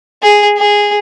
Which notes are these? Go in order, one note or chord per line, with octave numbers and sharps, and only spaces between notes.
G#4
G#4